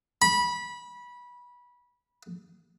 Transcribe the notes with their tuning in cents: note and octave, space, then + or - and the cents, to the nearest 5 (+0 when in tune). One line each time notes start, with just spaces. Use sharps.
B5 -20